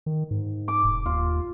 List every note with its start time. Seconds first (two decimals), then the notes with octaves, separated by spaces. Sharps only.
0.06 D#3
0.31 G#2
0.68 D6
0.84 E1
1.06 D#2 F4